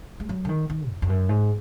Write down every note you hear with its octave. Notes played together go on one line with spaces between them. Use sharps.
G#3
F#3
D3
D#3
D#3
F2
F2
F#2
G#2